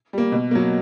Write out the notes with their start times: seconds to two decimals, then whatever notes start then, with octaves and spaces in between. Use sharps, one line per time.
0.13 G3 A#3
0.32 B2
0.51 F#3 A#3